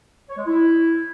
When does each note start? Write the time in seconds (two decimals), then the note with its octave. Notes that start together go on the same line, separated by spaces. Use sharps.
0.29 C#5
0.38 G#3
0.47 E4